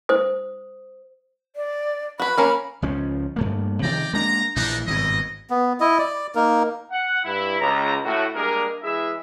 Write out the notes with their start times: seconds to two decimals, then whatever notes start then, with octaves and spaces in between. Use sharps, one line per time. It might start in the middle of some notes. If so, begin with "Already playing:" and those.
0.09 C5 D#6
1.56 D5
2.20 F#4 B4 B5
2.38 A#3 C#4 A#4
2.82 C#2 F3 C#4
3.36 G2 A3 A#3
3.82 C3 D#3 F3 D5 G5 A#5
4.13 G#3 A#3 D4 A#5
4.56 A#1 A#2 E3 D4 D#4
4.87 G#1 G2 B2 E4 D#5
5.50 B3
5.80 E4 D#5
5.99 D5
6.35 A#3 D#4 A#4
6.91 F#5
7.25 G2 E4
7.59 C#2 A#5
8.04 A2 F#4
8.34 G3 G#3 A#3 D4 G#4 A#4
8.83 E3 G#3 E4 G#4 E5